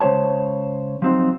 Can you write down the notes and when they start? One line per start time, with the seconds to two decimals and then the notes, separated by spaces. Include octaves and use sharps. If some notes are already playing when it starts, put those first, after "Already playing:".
0.01 C#3 G#3 C5 C#5 A5
1.02 F3 F#3 C4 D#4